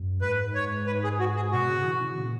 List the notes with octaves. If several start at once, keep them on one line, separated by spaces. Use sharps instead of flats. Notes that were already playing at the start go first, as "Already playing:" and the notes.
Already playing: F#2
G#2 B4
C#5
B4
G#4
F#4
G#4
B2 F#4
C#3
E3
C#3
A#2